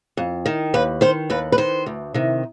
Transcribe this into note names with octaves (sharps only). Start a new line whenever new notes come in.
F2
D#3
D#2 B4
D#3 C5
D#2 B4
B4
D#3 C5
D2
C3 D#3